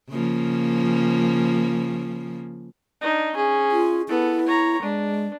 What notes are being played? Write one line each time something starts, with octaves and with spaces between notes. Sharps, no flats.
C#3 F3 A#3
D4 D#4
C#4 G#4
F4
B3 E4 A4
C#5 A#5
G#3 D4